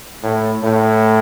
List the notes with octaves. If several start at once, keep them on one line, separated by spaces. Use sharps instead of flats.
A2
A2